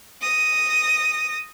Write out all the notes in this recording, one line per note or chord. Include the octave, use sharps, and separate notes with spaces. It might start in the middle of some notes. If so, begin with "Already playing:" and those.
D#6 A#6